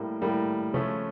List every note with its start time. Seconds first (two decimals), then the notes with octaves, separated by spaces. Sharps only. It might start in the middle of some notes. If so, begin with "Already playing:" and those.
Already playing: A2 G3 A#3
0.22 A2 G3 A#3
0.74 C#3 F3 A3 C#4